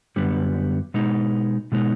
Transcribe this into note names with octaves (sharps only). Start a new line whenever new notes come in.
F#2 D3 G3 B3
B2 G#3 B3 D#4
B2 G#3 B3 D#4